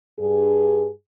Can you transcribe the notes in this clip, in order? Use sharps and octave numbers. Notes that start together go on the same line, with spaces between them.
G2 G#4